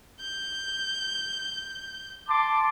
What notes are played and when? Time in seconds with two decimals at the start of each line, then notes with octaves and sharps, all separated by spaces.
0.20 G6
2.28 A5 C6 D6